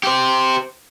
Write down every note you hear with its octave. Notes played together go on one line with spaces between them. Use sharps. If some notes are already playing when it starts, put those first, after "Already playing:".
G4 C5